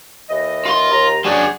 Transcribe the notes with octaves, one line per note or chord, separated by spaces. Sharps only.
D#2 E3 D#5
F4 C6
D#2 A#5
F#3 D4 G#4